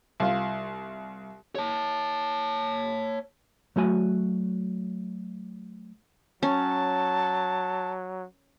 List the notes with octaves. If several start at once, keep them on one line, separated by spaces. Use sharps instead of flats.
C2 F4
C#5 A5
F#3 A3 F#4 G#5
F#3 C#4 A5